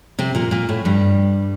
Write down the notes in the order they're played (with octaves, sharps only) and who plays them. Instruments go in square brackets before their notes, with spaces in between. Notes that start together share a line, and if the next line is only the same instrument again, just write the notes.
[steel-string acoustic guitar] C3 C4
A#2 A#3
A#2 A#3
A2 A3
G2 G3